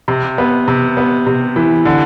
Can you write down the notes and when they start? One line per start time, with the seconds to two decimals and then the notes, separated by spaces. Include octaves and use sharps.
0.08 C3
0.38 B3
0.68 C3
0.97 B3
1.26 C3
1.56 E3
1.85 D3